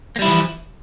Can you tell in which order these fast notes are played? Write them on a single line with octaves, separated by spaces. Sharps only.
A#3 G3 E4 F3 E3